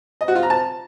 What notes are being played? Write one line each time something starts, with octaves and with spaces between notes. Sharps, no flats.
D#5
F#4
F4
A#5
A5